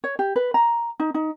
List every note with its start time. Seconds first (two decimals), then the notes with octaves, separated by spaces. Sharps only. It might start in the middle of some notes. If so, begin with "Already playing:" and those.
0.04 C#5
0.19 G4
0.36 B4
0.54 A#5
1.00 D#4
1.14 D#4